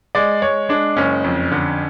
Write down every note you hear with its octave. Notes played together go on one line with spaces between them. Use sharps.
G#3 D5
G#3 C#5
G#3 D4
F#1 C#4
F2
D3